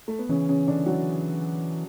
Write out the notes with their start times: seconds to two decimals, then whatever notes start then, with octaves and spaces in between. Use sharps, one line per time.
0.08 A3
0.19 B3
0.29 C#3 E3 C#4
0.48 C#3 C#4
0.67 D3 D4
0.86 F#3 F#4